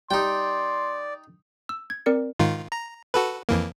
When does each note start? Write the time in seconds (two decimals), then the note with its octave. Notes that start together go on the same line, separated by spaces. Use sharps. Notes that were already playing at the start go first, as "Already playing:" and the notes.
0.11 G3 D#4 D5 G5 C6
1.69 E6
1.90 G#6
2.06 C4 A#4 D5 C#7
2.39 G#2 D#3 F4
2.72 A#5
3.14 F#4 A4 B4
3.49 F2 E3 A#3